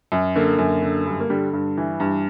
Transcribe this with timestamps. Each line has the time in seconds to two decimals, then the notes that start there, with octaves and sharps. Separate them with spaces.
0.12 F#2
0.35 D3 A#3
0.59 F#2
0.82 D3
1.06 G2
1.20 A#3
1.30 D3 G3
1.53 G2
1.77 E3
2.00 G2